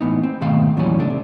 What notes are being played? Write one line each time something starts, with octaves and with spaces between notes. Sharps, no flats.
A2 E3 B3 D#4
C4
G#2 B2 D#3 A3 F5 C6
E2 A#2 E3 F#3 G3 C#4
C#3 A3 D4
C3